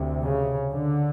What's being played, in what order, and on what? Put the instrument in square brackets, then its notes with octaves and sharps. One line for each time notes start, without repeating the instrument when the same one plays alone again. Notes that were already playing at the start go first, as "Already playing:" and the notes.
Already playing: [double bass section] D2 C3
C#3
D3